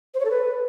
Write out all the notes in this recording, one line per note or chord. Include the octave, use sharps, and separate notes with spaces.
C5
C#5
A4
B4